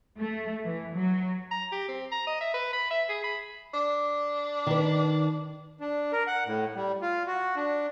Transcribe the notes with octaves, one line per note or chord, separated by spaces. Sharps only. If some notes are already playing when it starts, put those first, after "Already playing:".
A3
E3
F#3
A#5
G4
C4
A#5
D#5
E5
B4
B5
E5
G#4
B5
D4
D#3 B4
D4
A#4
F#5
A2
G3
F4
F#4
D4